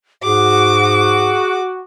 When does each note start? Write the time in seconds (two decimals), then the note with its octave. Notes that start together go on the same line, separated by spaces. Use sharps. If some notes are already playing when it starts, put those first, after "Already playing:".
0.24 G#2 F#4 G#4 D6